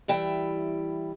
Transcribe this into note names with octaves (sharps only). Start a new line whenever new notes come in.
E3 G3 E4 G5